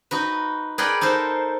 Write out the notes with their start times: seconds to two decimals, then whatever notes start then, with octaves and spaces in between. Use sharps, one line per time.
0.11 D#4 F#4 B4
0.78 G#4 A#4 B4 D5 F#5 G5
1.01 D#4 A4 A#4 C5